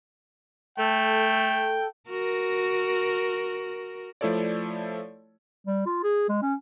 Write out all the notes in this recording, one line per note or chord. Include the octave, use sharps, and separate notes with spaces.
A3 A4 G5
F#4 A#4
F3 A3 E4 A4 C#5 D5
G3
F4
G#4
G#3
C#4